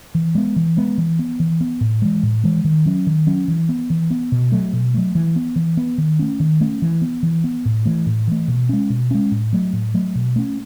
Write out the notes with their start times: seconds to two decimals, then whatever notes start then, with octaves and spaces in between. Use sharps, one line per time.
0.15 E3
0.35 G#3 B3
0.56 E3
0.77 G#3 B3
0.98 E3
1.19 B3
1.40 E3
1.61 B3
1.81 A2
2.02 E3 G#3
2.23 A2
2.44 E3 G#3
2.65 D#3
2.86 F#3 C#4
3.07 D#3
3.27 F#3 C#4
3.48 E3
3.69 B3
3.90 E3
4.11 B3
4.32 B2
4.52 F#3 A3
4.73 B2
4.94 F#3 A3
5.15 E3
5.36 B3
5.56 E3
5.77 B3
5.98 D#3
6.19 A3 C#4
6.40 D#3
6.61 A3 C#4
6.82 E3
7.02 B3
7.23 E3
7.44 B3
7.65 A2
7.85 E3 A3
8.06 A2
8.27 E3 A3
8.48 B2
8.69 G#3 C#4
8.90 B2
9.11 G#3 C#4
9.32 A2
9.53 F#3 A3
9.73 A2
9.94 F#3 A3
10.15 B2
10.36 A3 C#4